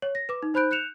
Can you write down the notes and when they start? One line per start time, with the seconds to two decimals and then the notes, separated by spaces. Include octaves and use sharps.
0.02 C#5
0.15 A#6
0.29 B4 D6
0.43 D#4
0.54 D#4 C5 B5 F#6 G6 D7
0.71 F#6 G6 C#7 E7 F7